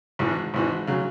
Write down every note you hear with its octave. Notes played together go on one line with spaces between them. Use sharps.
G#1 G#2 E3
G#1 G#2 E3
C#3 F#3